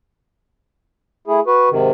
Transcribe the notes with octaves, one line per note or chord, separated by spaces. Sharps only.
A3 E4 G#4
F#4 B4
G#2 C3 D#3